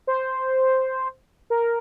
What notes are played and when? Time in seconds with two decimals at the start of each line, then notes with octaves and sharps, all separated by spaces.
0.07 C5
1.50 A#4